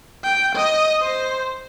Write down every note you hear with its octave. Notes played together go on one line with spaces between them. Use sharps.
G5
D#5
C5